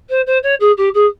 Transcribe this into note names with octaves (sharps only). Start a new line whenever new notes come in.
C5
C5
C#5
G#4
G4
G#4